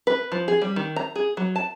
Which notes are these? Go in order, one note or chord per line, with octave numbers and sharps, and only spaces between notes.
B4
F3
G#4
G3
D#3
A#5
G#4
F#3
A5